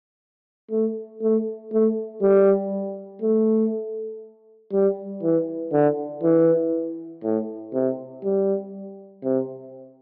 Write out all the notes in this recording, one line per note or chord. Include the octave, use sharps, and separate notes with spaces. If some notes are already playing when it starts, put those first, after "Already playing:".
A3
A3
A3
G3
A3
G3
E3
D3
E3
A2
C3
G3
C3